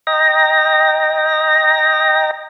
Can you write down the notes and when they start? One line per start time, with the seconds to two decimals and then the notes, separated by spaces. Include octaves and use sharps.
0.07 D#5 G5 A#5 A#6